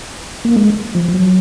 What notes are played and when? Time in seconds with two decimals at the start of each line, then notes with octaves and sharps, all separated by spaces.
0.45 A#3
0.57 G#3
0.95 F3
1.14 F#3